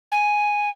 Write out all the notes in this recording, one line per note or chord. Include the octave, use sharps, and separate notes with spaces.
G#5